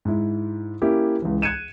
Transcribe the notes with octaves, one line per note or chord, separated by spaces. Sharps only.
G#2 E4
A#3 C#4 E4 G4
C#2 E3
F#6 G#6 C#7 D#7 E7